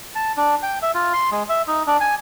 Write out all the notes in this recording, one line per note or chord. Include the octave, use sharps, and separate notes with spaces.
A5
D4
G5
E5
F4
C6
G#3
E5
D#4
D4
G#5